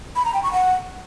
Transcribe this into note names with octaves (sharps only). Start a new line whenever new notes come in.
B5
A#5
G5
C#6
F#5